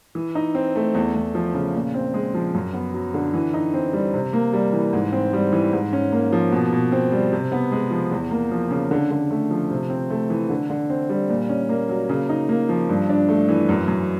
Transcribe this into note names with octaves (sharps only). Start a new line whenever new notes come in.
E3
D#4
C4
A3
E2
E2
F3
C#3
A#2
C4
G#3
F3
F#2
B3
F#3
D3
E3
D#4
C4
G3
C3
A#3
G3
E3
G#2
C4
G3
E3
G#2
C#4
A#3
F3
B2
B2
C4
G3
C3
B3
G#3
F3
E2
A#3
F3
C#3
D3
D3
A3
F3
C3
C4
A3
E3
D3
D3
C4
G3
A#2
C#4
A#3
F#3
C#3
D#4
A#3
F3
G2
D4
A3
E3
F#2
F#2